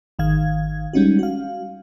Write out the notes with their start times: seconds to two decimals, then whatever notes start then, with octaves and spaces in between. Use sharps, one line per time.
0.19 G#1 D#3 F5 G#6
0.93 G3 G#3 C#4 D#4 F#4
1.19 F#4 F5